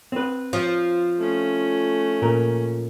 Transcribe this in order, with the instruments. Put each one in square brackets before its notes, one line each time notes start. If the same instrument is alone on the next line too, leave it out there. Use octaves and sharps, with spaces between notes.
[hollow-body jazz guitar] C4 B4
[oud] F3
[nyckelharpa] A3 C#4
[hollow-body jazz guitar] A#2 A#4